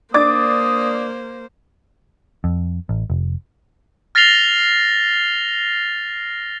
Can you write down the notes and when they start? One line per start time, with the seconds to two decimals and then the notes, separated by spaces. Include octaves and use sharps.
0.14 A#3 D4 C5 D6 D#6 A6
2.44 F2
2.89 A1
3.10 F1
4.15 F6 A6 A#6 C7 F7 G7